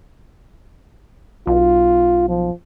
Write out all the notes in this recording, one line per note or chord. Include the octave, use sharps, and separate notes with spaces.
B1 F4
F3